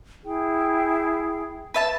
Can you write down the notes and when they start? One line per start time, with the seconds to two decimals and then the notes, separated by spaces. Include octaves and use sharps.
0.25 E4 G#4 G5
1.74 B4 E5 A5